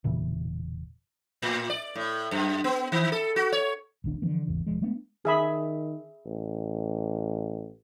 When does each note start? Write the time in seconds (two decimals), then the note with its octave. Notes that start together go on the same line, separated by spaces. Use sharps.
0.04 E1 A#2 C#3 E3
1.42 A2
1.70 D5
1.95 A2
2.31 F#2
2.64 B3
2.92 D#3
3.12 A4
3.36 F#4
3.52 C#5
4.04 E1 A#1 D#3 D4
4.22 D3 E3 F3 A#3
4.47 G#1 E2 C#3 E3
4.67 E1 F3 G#3
4.82 G#3 A3 B3 D4
5.25 D#3 G#4 E5 B5
6.25 A1